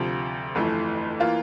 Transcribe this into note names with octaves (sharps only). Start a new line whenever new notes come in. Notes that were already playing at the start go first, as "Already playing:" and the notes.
Already playing: D2 C3 F3
G1 F2 E3 A3
E3 A#3 F4